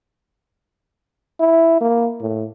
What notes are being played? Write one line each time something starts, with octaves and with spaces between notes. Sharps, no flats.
E4
A#3
A2